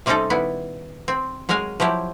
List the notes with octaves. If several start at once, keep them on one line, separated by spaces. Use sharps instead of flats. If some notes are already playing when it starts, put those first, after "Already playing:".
C3 G3 C4 C#4 D#4 A4
A#2 D#3 B3 E4
C4
F#3 G#3 A#4 F5 G#5
F3 F#3 E4 G4